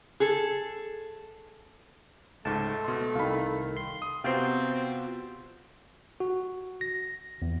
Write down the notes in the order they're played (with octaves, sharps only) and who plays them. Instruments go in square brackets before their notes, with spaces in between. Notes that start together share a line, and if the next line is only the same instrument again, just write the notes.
[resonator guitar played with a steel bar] G#4 A4
[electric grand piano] C#2 G#2 [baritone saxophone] A3 [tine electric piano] A5
[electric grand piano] B2 C6
[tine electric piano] C2 D#3 [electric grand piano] F5 B5
[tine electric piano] C6
[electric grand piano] D#6
[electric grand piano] C3 B3 C5 [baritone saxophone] C4 [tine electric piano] F4 F#4 C6
[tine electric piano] F#4
A#6
E2